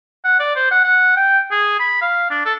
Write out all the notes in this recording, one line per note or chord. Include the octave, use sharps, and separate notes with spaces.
F#5
D5
C5
F#5
F#5
G5
G#4
B5
F5
D4
A4